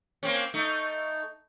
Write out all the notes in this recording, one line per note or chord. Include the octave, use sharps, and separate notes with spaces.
A#3 C4 C#4
A3 D#4